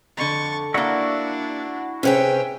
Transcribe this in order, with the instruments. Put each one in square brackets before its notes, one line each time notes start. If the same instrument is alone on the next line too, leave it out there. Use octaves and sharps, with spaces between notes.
[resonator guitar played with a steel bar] F2 D3 [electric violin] C#6 A6
[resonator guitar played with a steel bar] A#3 D5 [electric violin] D4 [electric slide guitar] E4 F#4
[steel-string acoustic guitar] C3 G4 G#4 [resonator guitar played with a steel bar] C#4 B4 C#5 [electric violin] E5 G5